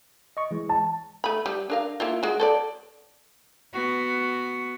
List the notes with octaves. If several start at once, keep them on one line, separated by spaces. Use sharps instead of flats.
D#5 C#6
E3 G#3
A5
A3 B5
G3
D4 A#4 F5
A#3 E4 F4
G#3 F#4
A4 C5 D5
B3 F#4